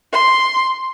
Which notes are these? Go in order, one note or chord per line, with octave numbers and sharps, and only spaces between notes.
C6